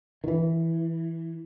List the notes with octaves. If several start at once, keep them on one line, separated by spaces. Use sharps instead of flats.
D#3
E3